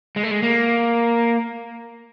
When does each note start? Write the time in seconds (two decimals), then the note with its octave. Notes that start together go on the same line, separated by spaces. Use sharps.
0.16 G#3
0.23 A3
0.31 G#3
0.43 A#3